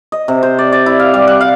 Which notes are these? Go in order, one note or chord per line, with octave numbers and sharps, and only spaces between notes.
D#5
C3
C5
D5
D5
E4
F5
G3
F#5
F5